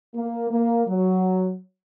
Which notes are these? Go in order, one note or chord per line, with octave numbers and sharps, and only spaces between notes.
A#3
A#3
F#3